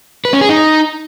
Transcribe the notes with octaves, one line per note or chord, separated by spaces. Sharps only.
B4
C#4
G#4
D#4